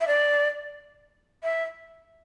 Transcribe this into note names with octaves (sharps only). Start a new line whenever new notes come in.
E5
D5
E5